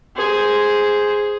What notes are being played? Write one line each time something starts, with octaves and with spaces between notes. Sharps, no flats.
G#4 C5